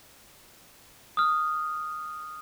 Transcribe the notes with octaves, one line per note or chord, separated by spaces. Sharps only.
D#6 F6